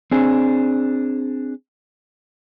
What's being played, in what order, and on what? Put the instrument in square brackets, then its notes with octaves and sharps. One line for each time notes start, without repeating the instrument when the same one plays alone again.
[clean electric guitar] C4 D4 G#4